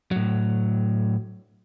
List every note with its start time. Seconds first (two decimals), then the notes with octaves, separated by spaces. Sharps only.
0.11 A2 F#3